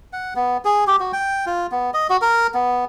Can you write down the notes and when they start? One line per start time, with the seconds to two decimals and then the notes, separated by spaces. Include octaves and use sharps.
0.13 F#5
0.36 B3
0.65 G#4
0.87 G4
1.00 F#4
1.13 G5
1.46 F4
1.72 B3
1.94 D#5
2.10 F#4
2.22 A#4
2.54 B3